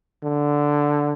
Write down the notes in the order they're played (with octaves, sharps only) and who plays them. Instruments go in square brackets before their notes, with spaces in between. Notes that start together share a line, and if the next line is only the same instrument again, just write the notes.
[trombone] D3